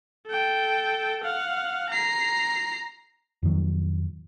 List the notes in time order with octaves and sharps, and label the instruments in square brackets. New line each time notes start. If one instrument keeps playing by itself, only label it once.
[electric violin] A4 G5
F5 F#5
A#5 C7
[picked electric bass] F2 A2 D#3 F#3